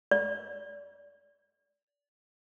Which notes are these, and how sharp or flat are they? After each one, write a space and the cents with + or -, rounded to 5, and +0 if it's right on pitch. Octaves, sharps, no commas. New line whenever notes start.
D5 -30